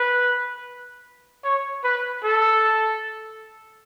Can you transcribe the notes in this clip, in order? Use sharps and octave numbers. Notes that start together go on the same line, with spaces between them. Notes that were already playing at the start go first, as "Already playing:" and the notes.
Already playing: B4
C#5
B4
A4